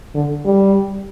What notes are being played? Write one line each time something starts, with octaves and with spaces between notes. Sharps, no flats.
D3
G3